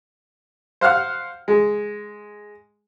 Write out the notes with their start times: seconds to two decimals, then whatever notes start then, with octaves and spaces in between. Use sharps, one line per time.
0.81 C5 F5 F#5 F6
1.48 G#3